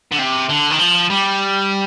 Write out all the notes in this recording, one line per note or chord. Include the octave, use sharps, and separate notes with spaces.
D3
C3
D3
D#3
F3
G3